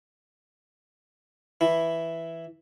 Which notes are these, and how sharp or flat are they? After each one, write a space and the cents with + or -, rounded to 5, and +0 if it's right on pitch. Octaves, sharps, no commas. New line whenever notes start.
E3 +0 E4 +0